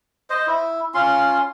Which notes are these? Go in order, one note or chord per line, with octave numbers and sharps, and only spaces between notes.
C5 D#5
E4
C#4 F4 C6